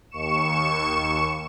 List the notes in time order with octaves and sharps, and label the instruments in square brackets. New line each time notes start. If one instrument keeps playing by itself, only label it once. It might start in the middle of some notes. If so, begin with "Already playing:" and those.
[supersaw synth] D#2 C#6 C#7 E7